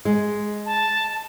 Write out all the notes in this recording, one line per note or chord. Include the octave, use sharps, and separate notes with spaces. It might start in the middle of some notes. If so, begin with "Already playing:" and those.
G#3
A5